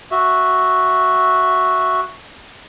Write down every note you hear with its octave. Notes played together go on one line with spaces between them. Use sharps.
F#4 E5